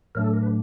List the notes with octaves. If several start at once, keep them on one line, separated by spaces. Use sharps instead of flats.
A2 F#3 A3 D4 A#4
A4
A#4
B4